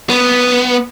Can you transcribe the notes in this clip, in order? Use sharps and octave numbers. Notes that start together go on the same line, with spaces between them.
B3